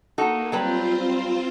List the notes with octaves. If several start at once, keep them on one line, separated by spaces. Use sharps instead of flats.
A#3 D#4 F#4 A4
F#3 G3 C4 F4 B4 C5